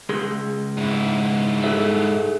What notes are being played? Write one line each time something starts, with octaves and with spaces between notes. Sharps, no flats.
C#2 G#4 C6
G#2 E4
G#4 A4 E5